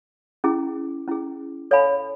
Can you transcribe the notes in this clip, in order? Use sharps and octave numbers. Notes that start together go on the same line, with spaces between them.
C#4 E4 G#4
C#4 E4 G#4
A4 C#5 F5 G#5 B5